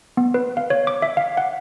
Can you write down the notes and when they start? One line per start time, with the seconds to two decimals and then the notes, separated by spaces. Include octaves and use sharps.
0.17 B3
0.34 B4
0.57 F5
0.70 C#5
0.87 D6
1.02 E5
1.17 F5
1.37 F#5